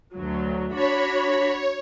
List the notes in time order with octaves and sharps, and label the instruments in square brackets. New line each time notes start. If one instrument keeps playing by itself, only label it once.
[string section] D2 F#3
[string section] D4 F#4 B5 [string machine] C#5